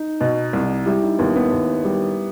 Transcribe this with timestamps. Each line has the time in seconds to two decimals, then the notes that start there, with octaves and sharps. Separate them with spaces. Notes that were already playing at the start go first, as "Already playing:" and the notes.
Already playing: D#4
0.21 B2
0.53 C2
0.86 G3 E4
1.03 D#4
1.18 D#2 B3
1.36 B3
1.52 D#2
1.84 G3